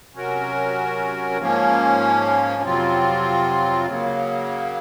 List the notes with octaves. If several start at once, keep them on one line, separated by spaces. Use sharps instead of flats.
C3 F#3 C#4 F#4 A#4
G#2 F3 A#3 C#4
F2 C3 F#3 C4 F4
C#3 F#3 A#3